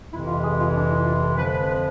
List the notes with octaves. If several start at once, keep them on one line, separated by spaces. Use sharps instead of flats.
F2 C3 E3 G#3 E4
F4
G#4
F4
D4
E4
F4
A4
F2 D3 F3 G#3 B4
B4
B4